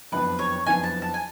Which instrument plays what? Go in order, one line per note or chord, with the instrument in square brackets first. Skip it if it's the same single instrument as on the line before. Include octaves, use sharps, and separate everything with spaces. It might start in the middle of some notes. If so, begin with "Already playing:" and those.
[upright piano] F#1 F2 F3 B3 D4 [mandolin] B4
[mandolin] C#5
[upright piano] F#1 F2 F3 B3 D4 [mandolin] G#5
[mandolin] A5
A5
G#5